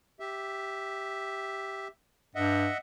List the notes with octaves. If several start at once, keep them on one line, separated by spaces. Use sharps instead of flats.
G4 E5
G2 D#5 E5 F#5